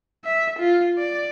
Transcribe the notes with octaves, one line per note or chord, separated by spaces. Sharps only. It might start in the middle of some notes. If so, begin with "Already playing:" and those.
E5
F4
D5